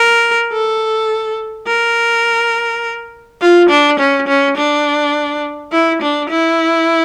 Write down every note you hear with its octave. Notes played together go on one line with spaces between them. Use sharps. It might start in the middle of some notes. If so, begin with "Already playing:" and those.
Already playing: A#4
A4
A#4
F4
D4
C#4
C#4
D4
E4
D4
E4